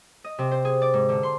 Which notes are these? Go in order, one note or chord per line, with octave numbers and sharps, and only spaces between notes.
D#5
C3
C5
G#4
D5
G#2
D3
C6